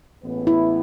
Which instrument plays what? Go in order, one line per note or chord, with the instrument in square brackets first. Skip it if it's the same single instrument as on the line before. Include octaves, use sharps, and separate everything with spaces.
[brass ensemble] A1 A2 E3 G#3 B3
[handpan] E4